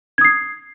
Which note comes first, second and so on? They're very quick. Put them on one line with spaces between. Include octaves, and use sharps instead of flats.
G#6 D#6 C7